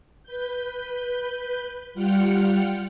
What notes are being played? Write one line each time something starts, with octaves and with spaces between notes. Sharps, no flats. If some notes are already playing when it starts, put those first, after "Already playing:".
B4 G6
G3 F4 F#5 G5 F6 C#7